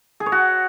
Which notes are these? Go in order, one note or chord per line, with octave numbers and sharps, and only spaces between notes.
G#4
C#5
F#4